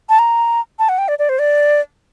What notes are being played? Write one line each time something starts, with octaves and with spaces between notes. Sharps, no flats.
A5
A#5
A5
F#5
G5
D5
D5
C5
D5